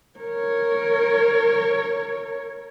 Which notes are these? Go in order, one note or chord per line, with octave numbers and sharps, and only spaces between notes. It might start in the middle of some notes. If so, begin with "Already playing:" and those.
A#4 C#5